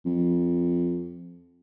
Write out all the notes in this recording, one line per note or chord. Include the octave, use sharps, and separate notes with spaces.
F2